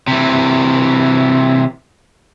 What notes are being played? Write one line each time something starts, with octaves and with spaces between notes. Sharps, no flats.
C3 E3